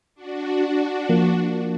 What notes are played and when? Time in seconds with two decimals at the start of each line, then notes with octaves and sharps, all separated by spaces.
0.15 D4 F#4
1.09 F3 A#3